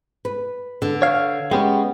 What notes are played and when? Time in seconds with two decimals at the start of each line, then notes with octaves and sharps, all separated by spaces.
0.25 B4
0.82 D3
1.02 C#5 F5
1.51 G#3 B3 C#4 G4